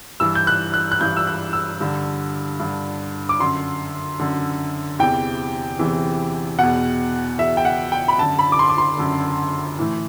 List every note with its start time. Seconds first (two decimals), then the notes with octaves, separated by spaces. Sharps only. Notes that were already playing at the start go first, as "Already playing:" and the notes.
0.20 G2 E3 E6
0.35 G6
0.47 F#6
0.74 F#6
0.92 F#6
1.01 G2 E3 G6
1.17 E6
1.27 F#6
1.53 E6
1.81 G2 D3
2.60 G2 D3
3.29 D6
3.40 F#2 D3 C6
4.20 F#2 D3
4.99 E2 C3 E3 G5
5.79 E2 C3 E3
6.58 E2 B2 F#5
7.38 E2 B2 E5
7.57 G5
7.65 F#5
7.92 G5
8.08 B5
8.18 F#2 D3 A5
8.39 B5
8.52 D6
8.59 C6
8.69 D6
8.78 C6
8.98 F#2 D3
9.79 A2 E3